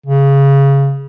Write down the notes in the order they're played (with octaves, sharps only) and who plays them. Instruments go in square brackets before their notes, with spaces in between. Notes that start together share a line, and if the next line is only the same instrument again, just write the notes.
[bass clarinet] C#3